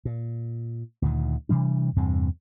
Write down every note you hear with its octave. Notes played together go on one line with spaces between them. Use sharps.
A#2
D2 A#2 D#3
C3 E3 G3 D4
E2 G2 C3 C4